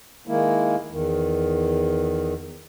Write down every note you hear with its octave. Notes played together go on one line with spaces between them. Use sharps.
D#3 G#3 A#3 E4
E2 D#3